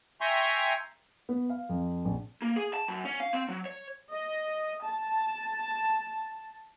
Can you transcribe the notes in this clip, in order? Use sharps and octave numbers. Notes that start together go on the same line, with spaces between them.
E5 G5 G#5 A#5 C6 C#6
B3
F5
F2
A#1
A#3
G#4
A5
F#2
C#4
F5
C4
F#3
C#5
D#5
A5